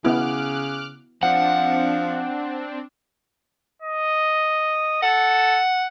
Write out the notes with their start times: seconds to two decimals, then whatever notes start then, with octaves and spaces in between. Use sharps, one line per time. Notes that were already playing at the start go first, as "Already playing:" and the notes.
0.05 C#3 B3 E4 D6 F6 F#6
1.23 F3 C4 D4 F#5
3.82 D#5
5.02 A4 F#5